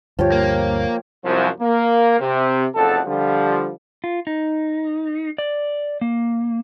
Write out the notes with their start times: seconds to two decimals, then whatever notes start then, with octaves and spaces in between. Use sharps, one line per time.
0.19 D2 G2 F3 G4 C#5
0.32 A#3
1.25 C2 F#2 F3
1.60 A#3
2.20 C3
2.75 F#1 F2 A4 F#5 A5
3.06 D3 F3 G3
4.04 F4
4.27 D#4
5.38 D5
6.01 A#3